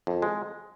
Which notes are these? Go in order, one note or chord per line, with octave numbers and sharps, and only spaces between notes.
F2
G#3